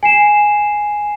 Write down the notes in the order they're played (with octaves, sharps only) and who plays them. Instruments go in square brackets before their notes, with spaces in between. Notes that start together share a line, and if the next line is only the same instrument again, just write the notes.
[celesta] G#5 C7 E7